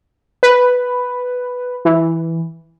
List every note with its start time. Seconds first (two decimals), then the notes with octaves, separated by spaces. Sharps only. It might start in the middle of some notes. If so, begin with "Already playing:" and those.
0.43 B4
1.85 E3